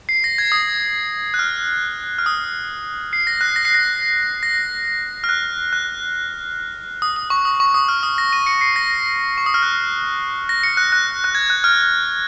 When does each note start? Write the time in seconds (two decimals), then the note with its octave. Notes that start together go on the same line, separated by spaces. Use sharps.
0.09 C7
0.24 A#6
0.38 G#6
0.52 D#6
1.34 F#6
1.39 F6
2.18 F6
2.26 D#6
3.13 C7
3.27 A#6
3.41 F#6
3.56 A#6
3.65 C7
3.75 A#6
4.43 A#6
5.24 F6
5.29 F#6
5.73 F#6
7.02 D#6
7.16 D#6
7.30 C#6
7.45 D#6
7.60 C#6
7.74 D#6
7.88 F6
8.03 D#6
8.18 A#6
8.33 D#7
8.46 C#7
8.61 C7
8.76 A#6
9.38 C#6
9.46 D#6
9.54 F6
9.62 F#6
10.49 A#6
10.63 C#7
10.77 F#6
10.92 F#6
11.24 F#6
11.35 G#6
11.50 F#6
11.64 F6